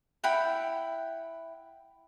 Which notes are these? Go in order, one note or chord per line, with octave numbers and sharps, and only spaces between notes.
E4 F#5 G5 B5